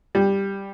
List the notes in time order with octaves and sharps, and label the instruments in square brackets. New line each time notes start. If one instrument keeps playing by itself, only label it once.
[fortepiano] G3